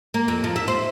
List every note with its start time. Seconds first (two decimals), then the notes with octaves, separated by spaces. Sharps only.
0.14 A#3
0.28 F2
0.44 F3
0.56 E5
0.68 C5